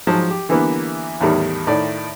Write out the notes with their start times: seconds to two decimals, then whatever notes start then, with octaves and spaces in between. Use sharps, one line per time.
0.07 G#2 F3 F#3 A5
0.30 G4
0.49 D3 E3 G3 A#3 B3 E4
1.21 E2 A2 D#3 G3 A#4
1.67 A2 D#3 E4 D5